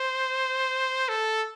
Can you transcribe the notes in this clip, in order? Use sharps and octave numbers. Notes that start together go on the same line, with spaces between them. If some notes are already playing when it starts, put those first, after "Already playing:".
Already playing: C5
A4